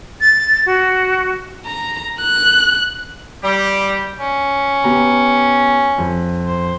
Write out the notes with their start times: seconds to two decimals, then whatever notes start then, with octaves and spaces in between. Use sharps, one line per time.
0.21 A6
0.66 F#4
1.66 A#5
2.21 F#6
3.44 G3 G4
4.18 C#4
4.84 B3 G4 A#5
5.98 F2
6.44 C5